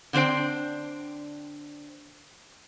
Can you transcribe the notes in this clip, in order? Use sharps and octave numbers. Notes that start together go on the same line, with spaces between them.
D3 C4 D4 C5 G5